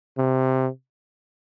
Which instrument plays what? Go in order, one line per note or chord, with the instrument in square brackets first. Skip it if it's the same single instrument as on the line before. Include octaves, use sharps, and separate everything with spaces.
[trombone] C3